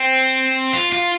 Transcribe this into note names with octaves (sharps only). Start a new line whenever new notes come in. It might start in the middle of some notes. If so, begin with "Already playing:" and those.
Already playing: C4
F4
F4